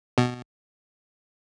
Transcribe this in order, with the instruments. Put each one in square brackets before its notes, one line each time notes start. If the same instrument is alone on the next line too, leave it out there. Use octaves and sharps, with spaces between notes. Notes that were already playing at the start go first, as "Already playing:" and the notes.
[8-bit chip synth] B2